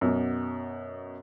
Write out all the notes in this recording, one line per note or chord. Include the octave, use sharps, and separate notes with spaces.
F#2 B2